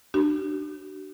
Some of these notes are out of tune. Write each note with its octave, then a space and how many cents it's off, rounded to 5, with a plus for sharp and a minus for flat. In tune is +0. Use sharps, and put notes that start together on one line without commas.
D4 +25 F#4 +40